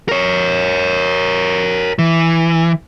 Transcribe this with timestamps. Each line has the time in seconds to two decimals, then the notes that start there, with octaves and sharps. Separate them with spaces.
0.09 A#4 C#5
1.99 E3